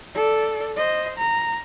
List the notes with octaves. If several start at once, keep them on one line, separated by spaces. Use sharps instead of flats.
A4 D5
C5 D#5
A#5